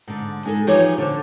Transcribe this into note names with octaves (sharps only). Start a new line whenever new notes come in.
G#2 D3
G#3 D#4 G#4 A4
E3 F3 D#4 G4 G#4 C#5
D3 C5